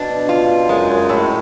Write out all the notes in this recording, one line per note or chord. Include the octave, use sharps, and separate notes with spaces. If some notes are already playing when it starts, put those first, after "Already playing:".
Already playing: B2 D4
F4
F#2 G#3
F#2
F#2 A2